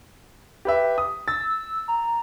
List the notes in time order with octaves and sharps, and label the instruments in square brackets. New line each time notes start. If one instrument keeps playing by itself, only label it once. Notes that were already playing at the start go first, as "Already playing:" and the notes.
[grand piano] G4 B4 E5
D#6
[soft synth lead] E6 [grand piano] A6
[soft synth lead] A#5